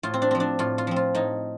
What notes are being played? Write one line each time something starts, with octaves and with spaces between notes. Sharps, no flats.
A2 F4
C4
D4
F3 C4
D4
A2 F4
F4
F3 C4
F4
A2 D#4